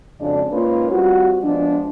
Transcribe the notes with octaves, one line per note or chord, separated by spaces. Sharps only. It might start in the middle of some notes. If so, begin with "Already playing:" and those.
F2 C#3 G#3 D4 F#4 D5
G#2 A#3 C#4 F4 B4 C#5
G3 C4 F4 F#4
F3 G#3 B3 D4